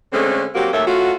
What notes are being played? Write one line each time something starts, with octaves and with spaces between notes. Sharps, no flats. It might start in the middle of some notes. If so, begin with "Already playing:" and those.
D3 G#3 A3 C4 C#4
F#3 A#3 C4 F#4 G4
D#2 A3 A#3 C#5 E5
A3 C#4 F4 F#4